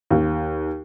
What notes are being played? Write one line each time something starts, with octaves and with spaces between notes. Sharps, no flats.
D#2